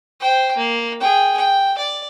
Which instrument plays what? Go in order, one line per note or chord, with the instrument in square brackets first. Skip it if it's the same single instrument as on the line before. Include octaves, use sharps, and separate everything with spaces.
[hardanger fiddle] C5 G5
A#3
G#4 G5
G5
D5